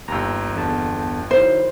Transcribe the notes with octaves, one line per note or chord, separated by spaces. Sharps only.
G1 D#2 A#5 E6
E2 D3 A5
D#3 F#3 E4 C5